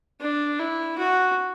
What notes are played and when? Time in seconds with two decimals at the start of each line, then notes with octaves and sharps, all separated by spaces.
0.21 D4
0.59 E4
0.98 F#4